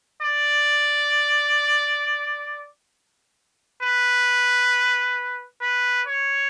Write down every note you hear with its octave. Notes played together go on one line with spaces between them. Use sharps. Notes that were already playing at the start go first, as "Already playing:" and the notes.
D5
B4
B4
C#5